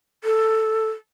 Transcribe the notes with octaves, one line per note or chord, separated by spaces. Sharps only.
A4